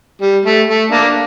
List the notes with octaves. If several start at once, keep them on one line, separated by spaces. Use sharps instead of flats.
G3
A3
A3
A#3 D4